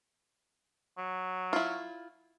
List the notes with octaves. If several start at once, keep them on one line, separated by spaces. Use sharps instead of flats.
F#3
E4 F4